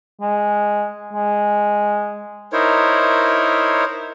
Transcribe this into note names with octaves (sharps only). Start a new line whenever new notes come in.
G#3
G#3
D#4 E4 A#4 C5 C#5